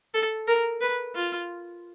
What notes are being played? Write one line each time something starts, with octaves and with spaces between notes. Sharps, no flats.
A4
A#4
B4
F4